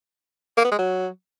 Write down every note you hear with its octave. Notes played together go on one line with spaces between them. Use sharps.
A#3
B3
G#3
F#3